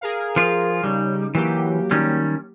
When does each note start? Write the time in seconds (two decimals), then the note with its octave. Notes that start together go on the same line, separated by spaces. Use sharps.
0.01 G#4 A#4 F5
0.36 F3 F4
0.84 C#3 G3 D#4
1.35 E3 F#3 A#3 G4
1.91 D#3 G3 C#4